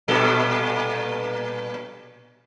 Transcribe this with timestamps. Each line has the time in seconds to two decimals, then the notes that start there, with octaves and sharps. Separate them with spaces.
0.08 G2 A#2 A4